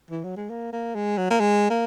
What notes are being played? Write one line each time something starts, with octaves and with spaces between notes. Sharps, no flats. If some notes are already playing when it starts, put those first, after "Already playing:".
E3
F#3
G#3
A#3
A#3
G#3
F#3
A#3
G#3
A#3